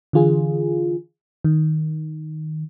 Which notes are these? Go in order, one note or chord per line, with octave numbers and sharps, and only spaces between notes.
D3 E3 F4 G#4
D#3